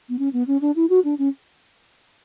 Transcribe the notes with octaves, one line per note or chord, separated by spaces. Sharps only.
B3
C#4
B3
C#4
D4
E4
F#4
D4
C#4